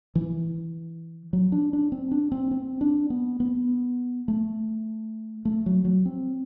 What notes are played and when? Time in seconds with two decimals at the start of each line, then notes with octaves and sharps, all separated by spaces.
0.15 E3
1.33 F#3
1.52 D4
1.73 D4
1.92 C4
2.11 D4
2.32 C4
2.51 C4
2.81 D4
3.10 B3
3.40 B3
4.28 A3
5.45 A3
5.66 F#3
5.85 F#3
6.05 C4